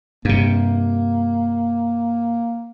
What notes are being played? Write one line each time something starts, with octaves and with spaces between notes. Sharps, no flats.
G2 C3 A#3